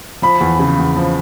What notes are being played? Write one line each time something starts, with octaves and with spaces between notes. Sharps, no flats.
F3 B5
E2
C#3
E2
F3